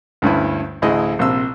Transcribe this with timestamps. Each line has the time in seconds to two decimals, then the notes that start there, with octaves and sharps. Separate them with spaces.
0.22 D2 G2 C#4 E4
0.82 A1 D2 E4 G#4 D#5
1.19 A#1 C3 E6